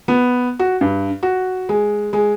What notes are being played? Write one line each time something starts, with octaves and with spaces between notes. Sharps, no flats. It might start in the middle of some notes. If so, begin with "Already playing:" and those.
B3
F#4
G2
F#4
G#3
G#3